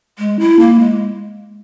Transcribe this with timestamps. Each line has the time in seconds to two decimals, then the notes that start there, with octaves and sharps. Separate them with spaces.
0.19 G#3
0.39 E4
0.59 A#3
0.80 G#3